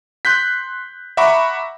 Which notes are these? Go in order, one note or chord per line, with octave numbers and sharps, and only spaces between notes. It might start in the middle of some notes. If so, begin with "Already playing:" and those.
C6 F#6 G6 B6
E5 F#5 A#5 B5 C#6 D6